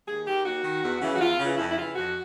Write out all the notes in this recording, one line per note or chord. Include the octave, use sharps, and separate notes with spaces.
D#2 G#4
D#3 G4
D#2 F#4
D#3
E2
C#3 E3
F#4
E2 F4
C#3
E3
F2 E4
E4
C#3 E3 F4
F2 F#4